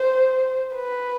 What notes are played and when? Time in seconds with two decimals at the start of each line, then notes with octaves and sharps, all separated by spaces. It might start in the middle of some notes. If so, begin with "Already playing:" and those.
Already playing: C5
0.76 B4